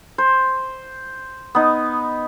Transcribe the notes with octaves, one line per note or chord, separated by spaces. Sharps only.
C5
B3 D#4